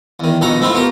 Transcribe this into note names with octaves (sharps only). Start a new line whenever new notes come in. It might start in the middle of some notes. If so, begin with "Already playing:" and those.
E2 D#3
A#1 B2 D#3 A4 A#5
G#2 A3 C4 E4 F4
B2 F4 G4 A#4